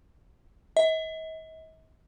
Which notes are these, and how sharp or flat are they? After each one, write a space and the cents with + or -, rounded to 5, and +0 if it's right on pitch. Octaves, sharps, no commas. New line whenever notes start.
D#5 +45